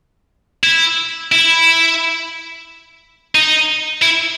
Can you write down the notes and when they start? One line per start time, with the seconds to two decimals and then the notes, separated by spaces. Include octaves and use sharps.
0.64 E4
1.32 E4
3.35 D#4
4.02 E4